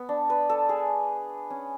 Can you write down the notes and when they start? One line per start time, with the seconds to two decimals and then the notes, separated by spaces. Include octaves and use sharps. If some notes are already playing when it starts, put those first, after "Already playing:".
Already playing: B3
0.09 D4
0.30 B4
0.50 A4
0.69 G#4
1.50 C#4